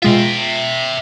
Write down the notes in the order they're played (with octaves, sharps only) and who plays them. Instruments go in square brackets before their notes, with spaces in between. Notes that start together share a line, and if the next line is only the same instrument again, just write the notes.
[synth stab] B2 G#3 F4 [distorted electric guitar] E5 G5